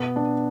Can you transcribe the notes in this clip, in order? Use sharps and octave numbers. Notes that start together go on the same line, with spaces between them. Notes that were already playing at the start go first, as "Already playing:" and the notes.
Already playing: B2 B3
D4